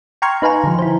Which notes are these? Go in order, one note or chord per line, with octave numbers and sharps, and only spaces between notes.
G5 A#5 C6 C#6 F6 G#6
D#4 B4 F5 G#5 A#5
D3 F3
E4 C5